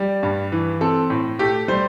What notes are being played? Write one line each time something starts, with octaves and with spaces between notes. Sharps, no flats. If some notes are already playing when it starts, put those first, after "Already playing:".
Already playing: G3 D5
G2
E3
C4 A4
A2
A3 G4
G3 C5